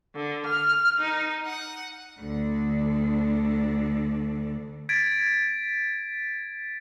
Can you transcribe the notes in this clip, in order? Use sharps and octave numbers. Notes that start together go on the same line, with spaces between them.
D3
F6
D#4
F#5
D2 D3
G#6 A6 B6 D7